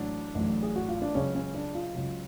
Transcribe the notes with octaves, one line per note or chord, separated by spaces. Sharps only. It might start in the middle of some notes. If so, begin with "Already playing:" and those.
Already playing: A1 A2 F#3 D4
A1 A2 F#3
G#4
F#4
F4
D4
C#2 C#3 F#3 C#4
C#4
D4
F4
C#2 C#3 F#3